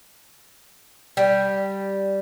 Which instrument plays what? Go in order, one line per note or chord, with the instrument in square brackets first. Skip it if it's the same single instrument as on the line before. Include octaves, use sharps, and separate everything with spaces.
[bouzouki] G3